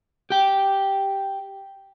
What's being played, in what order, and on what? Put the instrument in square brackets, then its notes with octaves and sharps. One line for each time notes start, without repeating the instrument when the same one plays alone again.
[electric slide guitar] G4 G5